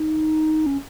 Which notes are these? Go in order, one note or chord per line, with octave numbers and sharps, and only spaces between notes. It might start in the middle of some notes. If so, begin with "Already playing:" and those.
Already playing: D#4
C#4